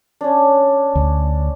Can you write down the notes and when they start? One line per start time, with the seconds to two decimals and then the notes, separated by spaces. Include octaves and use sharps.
0.21 C#4 D4
0.95 D2